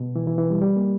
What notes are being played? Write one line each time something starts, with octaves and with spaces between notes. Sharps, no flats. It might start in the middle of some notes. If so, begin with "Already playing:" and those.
Already playing: B2
E3
E3
E3
G3
G3
A#3